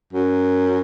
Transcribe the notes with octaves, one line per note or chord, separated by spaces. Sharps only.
F#2